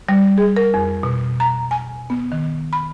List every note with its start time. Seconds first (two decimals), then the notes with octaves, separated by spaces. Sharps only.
0.09 G3
0.38 G#4
0.57 A#4
0.74 F2
1.03 B2
1.40 A#5
1.71 G#5
2.10 B3
2.32 D#3
2.73 B5